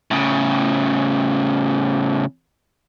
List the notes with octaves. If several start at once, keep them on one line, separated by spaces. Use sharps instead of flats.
A2 C#3